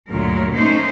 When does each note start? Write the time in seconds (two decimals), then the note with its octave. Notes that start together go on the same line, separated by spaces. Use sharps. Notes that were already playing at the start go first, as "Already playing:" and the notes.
0.10 D2 G2 A#2 F#3 A#4
0.53 A3 A#3 C#4 D#4 C5